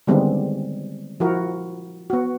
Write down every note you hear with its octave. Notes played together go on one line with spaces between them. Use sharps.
D3 D#3 G3 G#3 B3 C4
F3 E4 F#4 A#4
B3 F#4